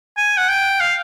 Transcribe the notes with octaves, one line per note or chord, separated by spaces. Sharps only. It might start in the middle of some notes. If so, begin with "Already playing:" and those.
G#5
F#5
G5
F5